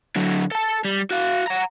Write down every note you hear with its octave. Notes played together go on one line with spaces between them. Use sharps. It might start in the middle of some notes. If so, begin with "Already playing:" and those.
D3 F#3
A4 A5
G3
F#4 F5
F#5 A#5